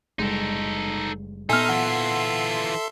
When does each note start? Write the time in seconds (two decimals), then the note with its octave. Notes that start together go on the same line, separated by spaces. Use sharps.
0.19 F#1 G3 G#3 D#4 A4
1.49 A#2 B3 D#4 A4 E5 G#5 C6 F6
1.69 E3 F4 F#5